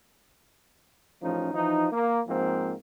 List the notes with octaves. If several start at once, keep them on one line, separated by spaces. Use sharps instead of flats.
A1 F3 C#4 D#4
E3 F3 D#4
A#3
G#2 F3 A#3 C4